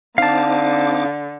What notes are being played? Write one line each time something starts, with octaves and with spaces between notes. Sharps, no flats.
D3 C4 D#4 F5 A5 D6